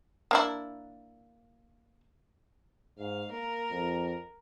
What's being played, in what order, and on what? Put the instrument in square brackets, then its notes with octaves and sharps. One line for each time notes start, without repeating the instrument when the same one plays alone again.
[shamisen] A#3 D4 E4
[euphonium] G#2 [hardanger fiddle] F5
[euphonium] A#3 [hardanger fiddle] A#4
[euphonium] F2